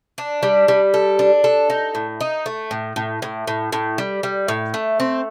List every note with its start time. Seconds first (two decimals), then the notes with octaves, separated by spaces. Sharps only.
0.18 D4
0.43 G3
0.68 G3
0.94 A4
1.19 D4
1.44 A4
1.70 D#4
1.95 A2
2.20 D#4
2.46 A3
2.71 A2
2.96 A2
3.22 A2
3.47 A2
3.72 A2
3.98 G3
4.23 G3
4.48 A2
4.74 A3
5.00 C4